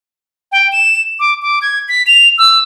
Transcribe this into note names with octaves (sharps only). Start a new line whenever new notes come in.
G5
E7
D6
D6
G#6
B6
F7
E6